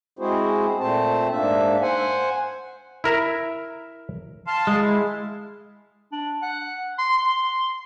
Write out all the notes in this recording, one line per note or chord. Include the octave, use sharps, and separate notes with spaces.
G#3 C4 E4 F#4 G#4 C5
A#2 A3 C4 C5 A5
G#2 A#3 D4 E5
C5 F#5 G#5
E4 A#4 E5
F5 A5 C6
G#3
E4
D4
F#5
C6
C6